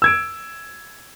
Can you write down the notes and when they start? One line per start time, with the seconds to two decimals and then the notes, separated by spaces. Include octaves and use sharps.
0.02 E6 G#6 D7